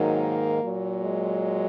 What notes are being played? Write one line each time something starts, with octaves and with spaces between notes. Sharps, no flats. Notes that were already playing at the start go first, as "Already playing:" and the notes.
Already playing: G#2 D#3 F#3 A#3
A#2 F#3
G#3